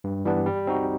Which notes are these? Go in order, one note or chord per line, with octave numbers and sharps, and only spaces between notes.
G2
E3 G3 B3 D4
G3
C4 D#4 F#4